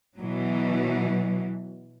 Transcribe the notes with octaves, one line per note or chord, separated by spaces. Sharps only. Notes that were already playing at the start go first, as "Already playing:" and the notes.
B2 E3 F#3